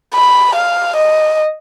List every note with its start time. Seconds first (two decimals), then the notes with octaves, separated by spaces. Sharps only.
0.15 B5
0.55 F5
0.96 D#5